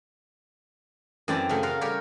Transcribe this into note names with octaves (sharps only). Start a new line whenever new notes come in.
F#2 E3 C4 D5 G5 A5
C#3 F#3 A3 C#4
F4 F#4 A#4 F5
G3 G4 A#4 C#5